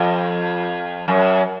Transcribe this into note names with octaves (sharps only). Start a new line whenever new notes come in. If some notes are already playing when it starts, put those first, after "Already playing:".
Already playing: F2
F#2